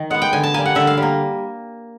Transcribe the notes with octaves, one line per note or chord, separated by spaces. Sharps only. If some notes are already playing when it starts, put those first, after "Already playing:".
Already playing: D#3
G#3 B3 F#5
G5
D3 G#5
A5
G3 A#3 G#5
F#5
D3 E5
F5
G3 A#3